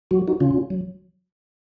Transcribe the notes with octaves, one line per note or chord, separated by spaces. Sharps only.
F#3 F#4
D#4 F#4
C#3 C#4 F4
F#3